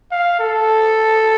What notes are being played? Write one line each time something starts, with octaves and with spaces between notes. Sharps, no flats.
F5
A4